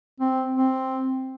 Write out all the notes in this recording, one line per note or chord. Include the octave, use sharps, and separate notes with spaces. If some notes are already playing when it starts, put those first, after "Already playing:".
C4
C4